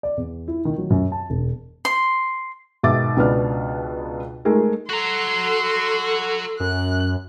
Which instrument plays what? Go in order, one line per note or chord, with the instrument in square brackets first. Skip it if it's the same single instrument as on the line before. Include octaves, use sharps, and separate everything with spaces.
[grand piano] D5
E2
E4
D#3
F#3
F#2
A5
E1
[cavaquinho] C6
[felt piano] G#2 B2 D#3 E5 D6 A6
C#2 B2 B3 D4 F6
G#3 A3 D#4 G#4 A#4
[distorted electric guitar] F#4 A#5 [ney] A4 [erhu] C6
[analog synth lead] F#2 [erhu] F#6